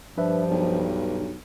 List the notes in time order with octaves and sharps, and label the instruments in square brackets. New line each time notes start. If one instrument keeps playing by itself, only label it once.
[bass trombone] G2 [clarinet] F3 [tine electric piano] D4 B4 E5
[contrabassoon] B1 [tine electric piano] D4